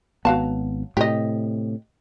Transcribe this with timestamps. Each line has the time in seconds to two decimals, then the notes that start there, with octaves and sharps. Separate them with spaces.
0.25 G#1 F#3 B3 F5 A5
0.97 A2 C3 G4 D#5